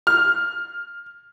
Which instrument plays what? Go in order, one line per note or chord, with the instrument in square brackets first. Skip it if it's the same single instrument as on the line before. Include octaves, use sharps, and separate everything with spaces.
[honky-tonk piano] F6